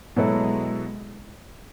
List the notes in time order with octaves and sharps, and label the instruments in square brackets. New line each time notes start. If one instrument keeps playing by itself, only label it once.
[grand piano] B2 F#3 B3 E4 A4 [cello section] G#3